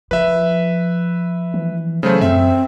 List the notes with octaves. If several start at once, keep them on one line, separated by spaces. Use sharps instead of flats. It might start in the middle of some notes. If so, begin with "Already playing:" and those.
F3 B4 E5
E3
C#3 F#3 A3 C5
F#2 C4 E5